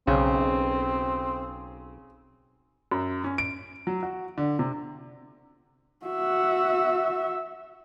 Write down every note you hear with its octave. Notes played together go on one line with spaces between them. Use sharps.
B1 C#3 C4
F#2
C#4
D7
F#3
F#4
D3
C3
F#4 E5